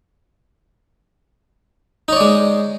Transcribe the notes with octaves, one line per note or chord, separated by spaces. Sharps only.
G#3 D#4 C#5 D5